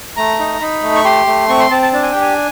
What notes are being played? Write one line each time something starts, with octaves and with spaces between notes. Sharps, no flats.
A3 A#5
D#4
D#4 B5
A3
C#6
G4 C6
A3
C4 C#6
C6
C4 A5
A5
D4 A5
G#5
G4 G5
G#5